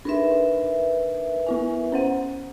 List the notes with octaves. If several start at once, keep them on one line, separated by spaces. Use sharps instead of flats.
D4 D#4 A#4 B4 E5
B3 E4 G#5
C#4 C5 F#5